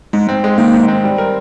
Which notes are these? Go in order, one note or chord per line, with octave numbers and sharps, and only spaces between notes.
G#2 G#3
C4
G#3
D#3 A#3
G#2
C4
G3
A#4